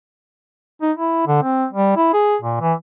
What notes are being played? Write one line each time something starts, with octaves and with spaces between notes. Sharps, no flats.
D#4
E4
D3
C4
G3
E4
G#4
A#2
E3